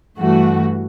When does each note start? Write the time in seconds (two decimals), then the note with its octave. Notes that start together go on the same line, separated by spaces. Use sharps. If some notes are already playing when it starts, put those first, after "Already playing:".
0.18 G2 E3 A3 F#4